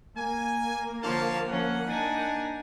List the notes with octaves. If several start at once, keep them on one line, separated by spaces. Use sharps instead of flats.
A#3 G#5
D3 F3 C#5 F5 A5
F3 C#4 F#5
D4 D#4 G#5